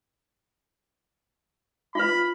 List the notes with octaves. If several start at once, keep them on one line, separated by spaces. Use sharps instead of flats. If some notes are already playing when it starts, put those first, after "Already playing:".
F4 B4 B5